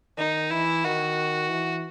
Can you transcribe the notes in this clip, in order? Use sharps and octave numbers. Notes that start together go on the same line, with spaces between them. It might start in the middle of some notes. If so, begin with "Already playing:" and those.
D#3 D#4
E3 E4
D#3 F#4
E3